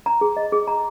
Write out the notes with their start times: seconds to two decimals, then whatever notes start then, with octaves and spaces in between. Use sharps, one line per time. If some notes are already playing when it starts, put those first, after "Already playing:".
0.06 A#5
0.21 G#4
0.37 D#5
0.52 G#4
0.68 A#5